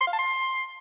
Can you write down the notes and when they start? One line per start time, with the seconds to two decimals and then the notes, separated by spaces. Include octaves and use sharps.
0.01 C6
0.07 F5
0.13 A5
0.19 C6